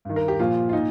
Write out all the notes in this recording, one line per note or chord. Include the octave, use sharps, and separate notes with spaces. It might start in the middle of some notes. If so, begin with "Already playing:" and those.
G2 D#3
A#4
G4
A#2 F3 F4
F4
A#2 D#4